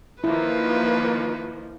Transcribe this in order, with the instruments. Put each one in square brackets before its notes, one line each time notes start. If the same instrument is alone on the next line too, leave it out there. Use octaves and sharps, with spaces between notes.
[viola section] D#3 F3 A#3 [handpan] E4 [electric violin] B4